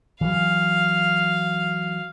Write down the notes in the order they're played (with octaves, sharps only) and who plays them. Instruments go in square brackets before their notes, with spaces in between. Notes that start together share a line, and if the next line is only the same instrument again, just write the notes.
[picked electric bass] E3 F#3 [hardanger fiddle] F5